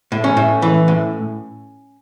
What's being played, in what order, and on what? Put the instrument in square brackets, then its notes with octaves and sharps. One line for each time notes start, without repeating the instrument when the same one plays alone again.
[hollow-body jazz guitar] A2
C#4
A2
E3
A2